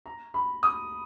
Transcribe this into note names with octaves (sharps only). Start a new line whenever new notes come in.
A#5
B5
D#6